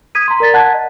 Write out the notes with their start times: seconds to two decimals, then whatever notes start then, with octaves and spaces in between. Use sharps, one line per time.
0.15 D#6 G#6 B6 D#7
0.28 A#5 C6
0.40 A#4 D5 A6 B6
0.54 F#5 A5 F#6 G#6
0.74 D#5